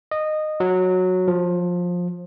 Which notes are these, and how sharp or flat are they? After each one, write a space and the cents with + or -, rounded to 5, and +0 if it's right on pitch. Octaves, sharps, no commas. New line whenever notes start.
D#5 -15
F#3 -10
F3 +20